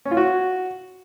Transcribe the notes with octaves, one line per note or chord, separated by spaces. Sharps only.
C#4
F4
F#4